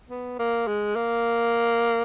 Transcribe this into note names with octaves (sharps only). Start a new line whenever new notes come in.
B3
A#3
G#3
A#3